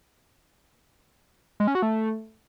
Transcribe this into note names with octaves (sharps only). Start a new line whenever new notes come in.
G#3
C#4
F#4
A3